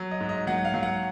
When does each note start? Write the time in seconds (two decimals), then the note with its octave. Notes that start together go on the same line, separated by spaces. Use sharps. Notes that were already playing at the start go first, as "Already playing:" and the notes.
Already playing: F#3
0.11 D#5
0.20 G#2
0.29 D#5
0.47 F#3 F#5
0.65 F5
0.74 F#3
0.83 F#5